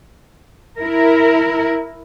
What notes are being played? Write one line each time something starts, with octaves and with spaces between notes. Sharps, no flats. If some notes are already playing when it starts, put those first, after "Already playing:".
E4 A#4